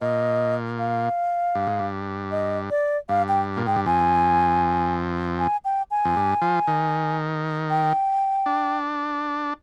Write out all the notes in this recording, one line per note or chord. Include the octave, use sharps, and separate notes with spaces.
A#2 D#5
F5
G2
G#2
G2
D#5
D5
G2 F5
G5
A#2
G#2 G5
G2
F2 G#5
G#5
G5
G#5
F2
G2
F3
D#3
G5
D4